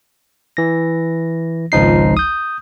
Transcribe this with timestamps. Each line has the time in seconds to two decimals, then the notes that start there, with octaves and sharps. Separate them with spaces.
0.57 E3 A#6
1.72 G#1 C#2 F3 D#4 C7
2.17 D#6 G6